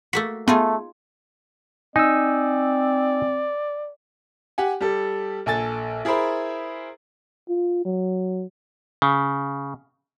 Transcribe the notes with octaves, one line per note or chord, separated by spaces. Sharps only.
A3 A#3 F#4 B6
A3 B3 D#4 F4 G#4
C4 D#4 D5 G#5 E6
G4 F#5 G#5
G3 G4 A4
A#1 A4 G#5 A6
E4 G#4 A#4 C5 B5
F4
F#3
C#3